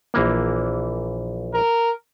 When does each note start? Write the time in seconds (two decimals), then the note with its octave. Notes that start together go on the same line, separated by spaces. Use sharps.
0.14 A#1 E3 A#3
1.54 A#4